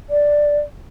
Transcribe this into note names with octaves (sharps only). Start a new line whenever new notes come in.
D5